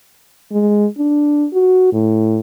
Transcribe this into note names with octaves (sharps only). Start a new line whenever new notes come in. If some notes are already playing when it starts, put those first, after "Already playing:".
G#3
D4
F#4
A2